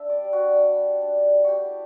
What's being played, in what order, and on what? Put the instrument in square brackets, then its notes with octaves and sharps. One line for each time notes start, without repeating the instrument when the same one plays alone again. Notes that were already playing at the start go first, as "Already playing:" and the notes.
Already playing: [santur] D4 E5
G3 D5
G3
F#4
D4
D4
G3
G3
D4
D4
G3
A3 F#4 G4
E4